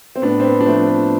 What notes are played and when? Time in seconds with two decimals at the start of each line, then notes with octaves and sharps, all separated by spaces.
0.16 C4
0.22 A2 B3 D4
0.40 C4
0.44 B3
0.61 D4
0.66 F3 A3 C4
0.88 B3